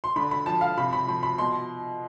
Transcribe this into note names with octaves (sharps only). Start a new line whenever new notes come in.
C6
D3 B5
B5
F3 A5
F5
C3 B5
B5
F3 B5
B5
B2 C6